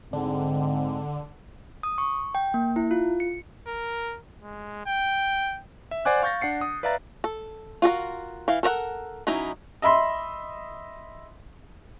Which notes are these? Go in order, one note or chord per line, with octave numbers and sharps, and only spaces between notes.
G#2 D3 C4
D#6
C#6
G5
A#3
E4
F4
C#7
A#4
G#3
G5
E5
C5 D5 F#5 G#5 D6 F#6
F5 C#6 G6 A6 A#6
D4 F#5 C7 C#7
D#6
B4 D5 E5 F5 A#5 A6
A4
F4 F#4 A4 A#4
E3 F5
A4 A#4 D5 F#5
F#3 C#4 D#4 E4
D#5 E5 B5 C6